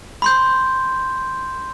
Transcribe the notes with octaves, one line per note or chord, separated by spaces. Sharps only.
B5 C6 G6